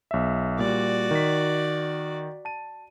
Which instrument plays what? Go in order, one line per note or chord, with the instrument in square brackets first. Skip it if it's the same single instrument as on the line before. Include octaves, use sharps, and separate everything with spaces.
[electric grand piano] B1 E5
[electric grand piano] A#2 G3 [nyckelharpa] F#4 D5
[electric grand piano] D#3 B6
A5 D#7